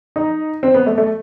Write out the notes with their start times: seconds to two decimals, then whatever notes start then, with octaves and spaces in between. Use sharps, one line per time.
0.16 D#4
0.63 C4
0.74 B3
0.87 A3
0.98 A3